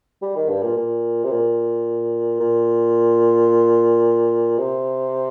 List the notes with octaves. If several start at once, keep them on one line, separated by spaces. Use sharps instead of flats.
G3
D#3
G2
A#2
A#2
C3
A#2
A#2
C3